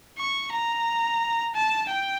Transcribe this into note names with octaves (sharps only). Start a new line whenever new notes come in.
C#6
A#5
A5
G5